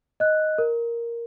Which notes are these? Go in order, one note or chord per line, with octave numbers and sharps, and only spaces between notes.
D#5 F#6
A#4